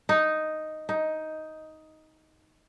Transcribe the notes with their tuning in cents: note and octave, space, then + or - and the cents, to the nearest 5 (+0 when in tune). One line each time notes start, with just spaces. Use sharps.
D#4 +0
D#4 +10